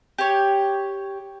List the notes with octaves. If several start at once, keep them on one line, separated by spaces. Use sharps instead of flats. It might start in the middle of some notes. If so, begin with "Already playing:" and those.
G4 C#5